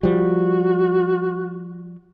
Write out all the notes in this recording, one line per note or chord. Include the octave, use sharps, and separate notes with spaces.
F3 G3 F#4